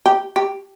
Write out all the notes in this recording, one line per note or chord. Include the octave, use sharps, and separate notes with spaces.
G4
G4